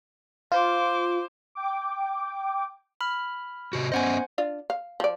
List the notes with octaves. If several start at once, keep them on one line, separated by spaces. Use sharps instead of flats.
F4 C5 D6
G5 D6
B5 F6
C3 F#4
B3 C#4 C5 D#5 F#5 G#5
D4 F4 F5
F5
F3 D5